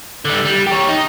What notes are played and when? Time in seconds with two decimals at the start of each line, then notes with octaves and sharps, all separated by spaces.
0.25 D3 G3
0.45 G3
0.67 G4 C#5
0.89 D#4